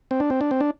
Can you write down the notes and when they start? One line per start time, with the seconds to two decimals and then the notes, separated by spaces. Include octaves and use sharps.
0.11 C4
0.20 D4
0.30 C4
0.41 D4
0.51 C4
0.61 D4